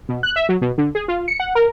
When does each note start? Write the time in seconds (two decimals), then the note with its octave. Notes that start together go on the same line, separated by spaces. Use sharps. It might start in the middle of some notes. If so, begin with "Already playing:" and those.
0.09 B2
0.23 F#6
0.36 E5
0.49 F#3
0.62 B2
0.78 D3
0.95 G#4
1.08 F4
1.28 C#7
1.40 F#5
1.55 A#4